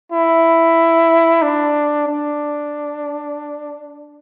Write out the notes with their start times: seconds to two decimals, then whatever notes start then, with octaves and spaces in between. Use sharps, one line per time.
0.12 E4
1.42 D4
2.07 D4